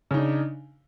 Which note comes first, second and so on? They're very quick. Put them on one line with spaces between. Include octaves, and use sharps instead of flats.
C#3 D#4 D4